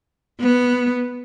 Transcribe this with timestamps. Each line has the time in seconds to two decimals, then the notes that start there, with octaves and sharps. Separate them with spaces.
0.41 B3